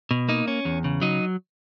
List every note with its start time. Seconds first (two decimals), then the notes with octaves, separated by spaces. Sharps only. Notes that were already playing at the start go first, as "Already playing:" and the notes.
0.11 B2
0.29 A#3 D#4
0.48 C#4
0.65 E2
0.84 C#3
1.01 F#3 D#4